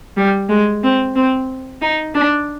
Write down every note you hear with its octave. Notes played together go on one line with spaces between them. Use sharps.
G3
G#3
C4
C4
D#4
D4